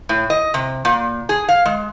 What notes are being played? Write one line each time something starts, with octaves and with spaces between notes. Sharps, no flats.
A2
D#5
C3
A#2
G#4
F5
G#3